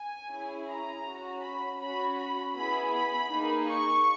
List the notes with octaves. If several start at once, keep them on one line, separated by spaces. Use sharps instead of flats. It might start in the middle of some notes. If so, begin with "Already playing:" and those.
Already playing: G#5
C#4 E4 G#4
A#5
C#4 F#4
B5
C#4 F#4 B5
B5
B3 E4 G#4 B5
B5
A#3 D#4 G#4
C#6